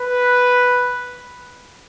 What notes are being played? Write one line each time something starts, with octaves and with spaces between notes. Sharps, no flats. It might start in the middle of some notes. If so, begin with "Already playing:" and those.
Already playing: B4